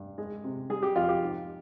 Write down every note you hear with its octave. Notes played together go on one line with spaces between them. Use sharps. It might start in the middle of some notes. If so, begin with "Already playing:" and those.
Already playing: G2
G#3
C3
G3 G#4
G4
F2 F4
G4
G#2